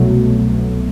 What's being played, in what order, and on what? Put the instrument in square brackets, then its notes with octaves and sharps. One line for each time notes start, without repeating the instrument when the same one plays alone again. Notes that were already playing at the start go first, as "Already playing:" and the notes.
Already playing: [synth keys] C2 B2 F#3 A3